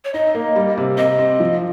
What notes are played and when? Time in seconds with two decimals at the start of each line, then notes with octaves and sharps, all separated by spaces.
0.05 C#5
0.14 D#4 D#5
0.35 A#3
0.56 G3
0.78 C3
0.97 C3 D#5
1.19 C4
1.40 F3